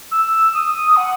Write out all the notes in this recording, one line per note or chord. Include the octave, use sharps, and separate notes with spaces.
E6
D#6
F#5